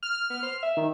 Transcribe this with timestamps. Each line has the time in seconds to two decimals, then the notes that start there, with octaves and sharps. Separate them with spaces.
0.03 F6
0.30 B3
0.43 C5
0.63 E5
0.77 D#3